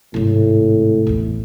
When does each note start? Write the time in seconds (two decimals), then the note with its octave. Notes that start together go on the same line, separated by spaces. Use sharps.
0.14 G#1 A2 C3
1.07 A1 E2